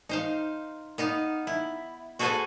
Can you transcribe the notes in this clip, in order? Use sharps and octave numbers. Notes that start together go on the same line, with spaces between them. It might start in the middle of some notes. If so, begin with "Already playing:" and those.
D#4 C5 F5
B3 D#4 F5
E4
F#4 G#4 A4 B4 C5 G#5